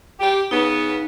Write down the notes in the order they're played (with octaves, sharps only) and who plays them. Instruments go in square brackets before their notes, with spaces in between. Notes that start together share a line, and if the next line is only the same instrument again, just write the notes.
[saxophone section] G4
[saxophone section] C#3 B3 [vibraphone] D#4